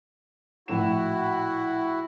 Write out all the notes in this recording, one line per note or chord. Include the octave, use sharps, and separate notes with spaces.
A#1 A2 E4 F#4 E7